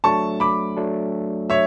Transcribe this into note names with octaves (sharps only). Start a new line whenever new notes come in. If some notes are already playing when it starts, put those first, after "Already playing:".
F#3 A3 D4 A5 C#6
B5 D6
F#3 A3 D4
F#3 C#5 E5